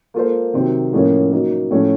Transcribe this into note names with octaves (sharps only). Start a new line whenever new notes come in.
A#3 F4 A4 C5
C3 D#3 F#3 C4
A2 F3 A#3 C#4
F#3 A#3 D#4
A2 F3 A3 C#4